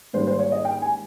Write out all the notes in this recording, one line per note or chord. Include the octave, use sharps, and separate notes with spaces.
G#2 D#3 G3 A#3 C5
C5
C#5
D#5
G5
G#5